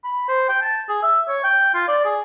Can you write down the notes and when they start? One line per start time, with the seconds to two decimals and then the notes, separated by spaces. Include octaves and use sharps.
0.04 B5
0.28 C5
0.49 G5
0.62 A5
0.89 G#4
1.03 E5
1.29 C#5
1.44 G5
1.74 F4
1.88 D5
2.05 G#4